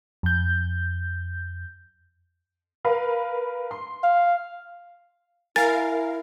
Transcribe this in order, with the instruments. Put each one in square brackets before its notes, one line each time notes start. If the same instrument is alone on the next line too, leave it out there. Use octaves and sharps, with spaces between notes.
[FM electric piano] F2 G6
[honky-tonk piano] A#4 B4 F5
C6
[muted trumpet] F5
[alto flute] E4 [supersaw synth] A#4 F5 [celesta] G#5 [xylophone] A6